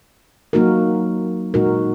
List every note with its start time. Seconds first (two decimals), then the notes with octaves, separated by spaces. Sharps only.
0.53 F#3 A#3 D#4 F#4 A#4
1.54 A#2 G#3 D#4 F#4 A#4